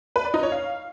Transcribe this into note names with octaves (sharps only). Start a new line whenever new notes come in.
B4
D5
D#4
C#5
F5